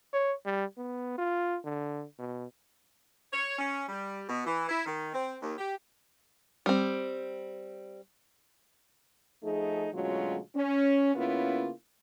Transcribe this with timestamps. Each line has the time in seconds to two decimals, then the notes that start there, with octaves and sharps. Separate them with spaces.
0.13 C#5
0.46 G3
0.77 B3
1.18 F4
1.64 D3
2.19 B2
3.32 C#5
3.59 C#4
3.88 G3
4.29 B2
4.46 E3
4.69 E4
4.86 D#3
5.14 C4
5.42 D#2
5.58 G4
6.66 G3 C4
9.43 F3 A3 D#4 G#4
9.93 D2 B2 F#3 G#3 C#4 F4
10.56 C#4
11.15 C#3 A#3 B3 C#4 E4 F4